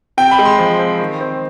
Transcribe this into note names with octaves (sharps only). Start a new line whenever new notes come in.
C3 G5
B5
G#3
C6
F3
C4
D#3
C4